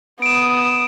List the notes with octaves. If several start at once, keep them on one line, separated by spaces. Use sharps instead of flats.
B3 D#6 D7 E7